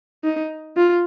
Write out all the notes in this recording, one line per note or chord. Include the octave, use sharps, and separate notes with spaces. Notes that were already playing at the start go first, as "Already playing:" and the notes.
D#4
F4